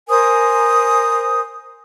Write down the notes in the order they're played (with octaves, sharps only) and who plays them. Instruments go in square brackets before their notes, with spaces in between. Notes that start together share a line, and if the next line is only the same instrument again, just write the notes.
[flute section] A#4 C5 G#5 D#6